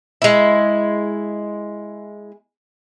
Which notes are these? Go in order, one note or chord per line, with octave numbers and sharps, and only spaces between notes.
G#3 E4